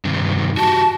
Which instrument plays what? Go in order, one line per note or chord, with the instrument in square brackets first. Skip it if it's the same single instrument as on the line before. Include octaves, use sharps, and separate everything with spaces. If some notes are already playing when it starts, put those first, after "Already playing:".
[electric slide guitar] G2 C3 D#3
[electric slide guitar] F#4 G4 [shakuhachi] A5